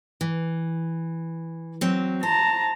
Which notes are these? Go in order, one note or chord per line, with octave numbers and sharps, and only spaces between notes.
E3
F#3 C4
C5 A5 A#5